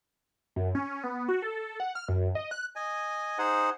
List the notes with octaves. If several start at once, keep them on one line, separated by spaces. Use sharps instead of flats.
F#2
C#4
B3
F#4
A4
F#5
F6
F#2
D#5
F#6
D#5 G#5
D#4 G#4 C5 F#5